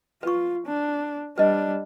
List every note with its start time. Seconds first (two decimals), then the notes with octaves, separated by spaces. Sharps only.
0.23 F4 B4 C#6
0.66 D4
1.38 G3 D4 B4 D#5